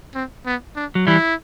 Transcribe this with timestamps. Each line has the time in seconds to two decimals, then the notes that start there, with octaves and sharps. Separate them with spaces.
0.15 C4
0.46 B3
0.76 D4
0.95 F#3
1.07 E3 G3 E4